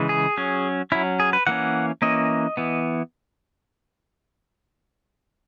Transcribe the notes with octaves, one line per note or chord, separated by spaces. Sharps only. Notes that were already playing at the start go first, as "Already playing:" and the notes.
Already playing: C#3 E3 G#3
G#4
F#3 C#4
F#3 C#4 E4
G#4
B4
E3 A#3 C#4 F#5
E3 A#3 C#4 D#5
E3 B3